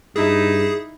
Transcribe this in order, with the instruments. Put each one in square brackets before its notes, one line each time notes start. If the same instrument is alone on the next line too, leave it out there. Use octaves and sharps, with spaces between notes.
[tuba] G2 [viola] D#4 E4 [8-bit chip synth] G#4